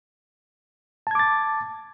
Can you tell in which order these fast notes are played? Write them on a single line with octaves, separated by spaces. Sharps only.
A5 G#6 D6 A6